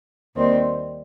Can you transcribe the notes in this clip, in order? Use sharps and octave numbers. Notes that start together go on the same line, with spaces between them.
D#2 D#3 G3 C4